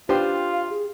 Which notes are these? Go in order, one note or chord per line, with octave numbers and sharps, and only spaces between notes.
D4 F4 G4 B4 C5 C6
F5
G#4